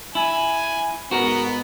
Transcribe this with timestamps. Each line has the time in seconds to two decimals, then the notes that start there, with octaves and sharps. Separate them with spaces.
0.15 E4 G#5
1.11 G#2 B3 F#4 A#4